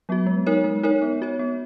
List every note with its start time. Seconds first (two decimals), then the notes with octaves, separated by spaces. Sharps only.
0.09 F#3 B3 F#4
0.26 G#3
0.46 D#4 A#4 C#5
0.64 G#3
0.83 D#4 A#4 C#5
1.02 B3
1.22 F#4 C#5
1.39 B3